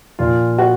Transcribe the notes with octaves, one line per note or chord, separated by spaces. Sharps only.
A#2 F3 F4
F#4